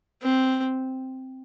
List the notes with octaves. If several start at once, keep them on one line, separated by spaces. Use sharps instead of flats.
C4